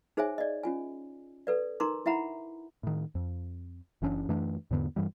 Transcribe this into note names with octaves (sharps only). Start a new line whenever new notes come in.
D#4 G#4 C5 C#5 E5 G#5
D5 D#5
C#4 F4 G#5
A4 B4 D5
D#4 A#4 A#5 C6 D6
E4 E5 F#5 A#5 B5
A2 D#3
F2
F#1 E3 C#4 D4
F#2 E3 A3 D4
E2 G#2 D3 B3
G2 E3 G3